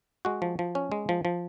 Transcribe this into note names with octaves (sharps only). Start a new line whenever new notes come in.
G#3 F#4
F3
F3
C#4
G#3
F3
F3